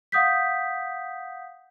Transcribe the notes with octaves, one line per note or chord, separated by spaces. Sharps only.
F5 F#5 D#6 G6 B6